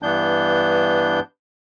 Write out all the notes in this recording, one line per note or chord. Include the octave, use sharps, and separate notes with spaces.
G2 E3 B3 D4 G6